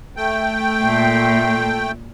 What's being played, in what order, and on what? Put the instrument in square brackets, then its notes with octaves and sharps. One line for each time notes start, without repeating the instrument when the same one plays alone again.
[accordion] A3 G5
[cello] A#2